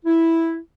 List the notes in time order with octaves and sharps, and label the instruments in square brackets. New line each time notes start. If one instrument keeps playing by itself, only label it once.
[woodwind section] E4